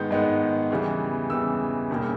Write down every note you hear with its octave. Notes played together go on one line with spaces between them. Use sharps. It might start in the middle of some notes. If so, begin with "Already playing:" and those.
Already playing: G#2 D#3 G#3 B3 G6
G#2 D#3 G#3 B3
E2 C#3 E3 G3
E2 C#3 E3 G3 E6
E1 D#2 C#3 G3 A#3